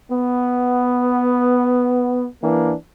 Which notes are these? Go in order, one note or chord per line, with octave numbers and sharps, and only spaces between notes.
B3
E3 A#3 D4